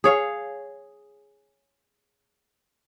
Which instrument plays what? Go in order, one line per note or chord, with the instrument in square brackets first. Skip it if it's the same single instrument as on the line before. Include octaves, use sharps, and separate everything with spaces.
[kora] G#4 C#5 F5